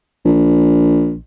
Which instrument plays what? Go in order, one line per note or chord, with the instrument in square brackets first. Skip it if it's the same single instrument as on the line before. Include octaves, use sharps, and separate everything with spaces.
[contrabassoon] A#1